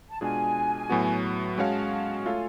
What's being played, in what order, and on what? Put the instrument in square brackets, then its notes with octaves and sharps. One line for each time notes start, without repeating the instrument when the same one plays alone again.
[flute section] A5
[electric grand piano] B2 G#3 D4 F4 G#4 [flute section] G#5
[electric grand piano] A2 F#3 B3 F#4
[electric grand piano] G#3 C#4 F#4 C#5 F5 [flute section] A5
[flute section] A5
[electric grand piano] A3 F4 A4 C#5 F5 [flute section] G#5